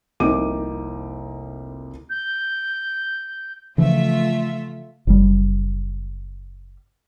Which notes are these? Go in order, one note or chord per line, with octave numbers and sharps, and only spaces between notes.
F1 C2 A#3 D#4 D6 D#7
G6
C#3 E3 F3 A3 F4 E5
F#1 G3